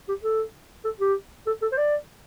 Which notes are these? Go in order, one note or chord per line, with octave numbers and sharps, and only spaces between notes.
G4
A4
A4
G4
A4
A4
C5
D5